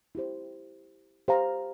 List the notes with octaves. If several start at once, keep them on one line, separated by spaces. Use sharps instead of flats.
E4 G4 C5
G4 C5 F5 A#5